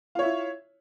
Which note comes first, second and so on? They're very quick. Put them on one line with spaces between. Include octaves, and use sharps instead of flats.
F4 C#5 E4